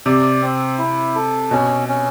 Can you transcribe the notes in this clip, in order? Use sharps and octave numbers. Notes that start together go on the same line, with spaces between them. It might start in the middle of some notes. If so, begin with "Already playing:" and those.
C3 D5
C4
E4
A4
B2 C#4
C#4